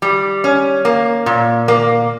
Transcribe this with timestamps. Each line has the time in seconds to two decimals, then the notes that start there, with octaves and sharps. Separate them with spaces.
0.02 G3
0.44 C#4
0.85 A#3
1.26 A#2
1.68 A#3